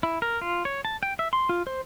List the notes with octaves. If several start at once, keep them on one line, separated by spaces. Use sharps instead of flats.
E4
A#4
F4
C#5
A5
G5
E5
C6
F4
C5